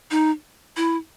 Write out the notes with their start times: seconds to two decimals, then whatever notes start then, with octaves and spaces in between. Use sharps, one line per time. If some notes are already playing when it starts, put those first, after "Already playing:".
0.11 D#4
0.77 E4